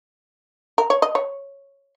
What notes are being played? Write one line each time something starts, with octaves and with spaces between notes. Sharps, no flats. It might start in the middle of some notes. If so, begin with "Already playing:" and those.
A#4
C#5
D#5
C#5